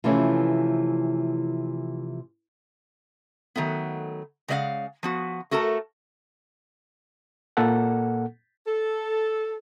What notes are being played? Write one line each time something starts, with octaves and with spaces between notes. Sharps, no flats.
C3 E3 F3 A3 C#4
D#3 F#3 A3 B3
C#3 G#3 D5 D#5 F5 F#5
F3 B3 F#4
A3 F#4 A4 A#4 A5
A#2 A#3 A4 F#5
A4